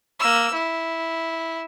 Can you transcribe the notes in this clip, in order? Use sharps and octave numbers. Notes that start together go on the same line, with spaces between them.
A#3 E6
E4